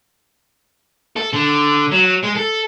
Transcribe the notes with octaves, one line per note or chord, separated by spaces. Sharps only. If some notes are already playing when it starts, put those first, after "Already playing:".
A4
D3
F#3
G#3
A4